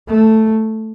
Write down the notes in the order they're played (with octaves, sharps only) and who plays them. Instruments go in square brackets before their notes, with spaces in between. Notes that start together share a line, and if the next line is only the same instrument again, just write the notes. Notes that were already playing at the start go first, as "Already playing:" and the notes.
[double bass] A3